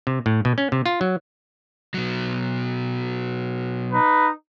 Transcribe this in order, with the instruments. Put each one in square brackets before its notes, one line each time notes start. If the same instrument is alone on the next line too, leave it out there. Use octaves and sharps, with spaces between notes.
[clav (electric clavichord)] C3
A2
B2
C#4
C3
F4
F#3
[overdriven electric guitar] B2 F#3
[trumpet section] D#4 B4